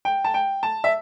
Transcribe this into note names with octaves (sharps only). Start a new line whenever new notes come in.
G5
A5
G5
A5
E5